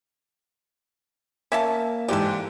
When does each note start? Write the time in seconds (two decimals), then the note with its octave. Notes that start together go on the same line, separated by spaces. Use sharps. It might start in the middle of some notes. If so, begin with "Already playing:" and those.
1.52 A#3 C#4 E5 A5
2.08 G#2 E3 G4 A4 D5